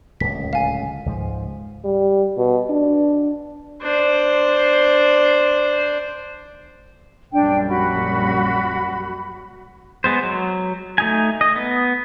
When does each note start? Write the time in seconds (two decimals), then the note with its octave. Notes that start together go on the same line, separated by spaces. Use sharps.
0.20 D1 C#2 B6
0.53 F5 G#5
1.06 C#2 G#2 F3
1.85 G3
2.37 B2
2.70 D4
3.83 D4 C5
7.33 A#1 F#2 G3 D4 G5
7.68 F#4 B5
10.04 G#3 B3 C5
10.23 F#3
10.98 A3 D#4 G#5
11.41 D#5
11.56 B3